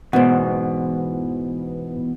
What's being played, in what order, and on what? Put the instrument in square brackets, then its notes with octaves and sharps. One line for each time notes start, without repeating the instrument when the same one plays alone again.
[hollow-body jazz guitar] G#2 B2 [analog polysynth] E3 B3 [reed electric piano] C5 F#5